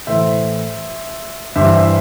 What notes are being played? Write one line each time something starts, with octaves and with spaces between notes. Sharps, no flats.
A2 E3 C5 E5
G2 E3 C5 E5
C5 E5